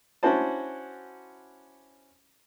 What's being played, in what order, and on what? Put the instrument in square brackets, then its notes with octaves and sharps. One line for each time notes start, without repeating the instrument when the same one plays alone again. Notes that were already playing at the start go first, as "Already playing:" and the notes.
[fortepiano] C#4 D4 E4 F#4 C5 A5